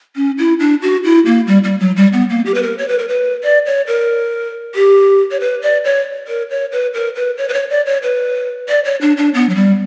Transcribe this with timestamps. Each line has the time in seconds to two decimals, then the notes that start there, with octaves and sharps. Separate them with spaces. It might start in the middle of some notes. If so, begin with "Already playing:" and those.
0.16 C#4
0.38 E4
0.60 D4
0.82 F#4
1.04 E4
1.26 A#3
1.47 G3
1.64 G3
1.80 F#3
1.96 G3
2.13 B3
2.30 A#3
2.46 G4
2.54 B4
2.63 A#4
2.78 C#5
2.88 B4
2.98 A#4
3.08 B4
3.44 D5
3.66 C#5
3.87 A#4
4.75 G4
5.31 C#5
5.40 B4
5.62 D5
5.85 C#5
6.28 A#4
6.50 C#5
6.72 B4
6.94 A#4
7.16 B4
7.38 C#5
7.49 B4
7.54 C#5
7.70 D5
7.86 C#5
8.03 B4
8.69 D5
8.85 C#5
9.01 D4
9.17 D4
9.34 B3
9.49 F#3
9.55 G3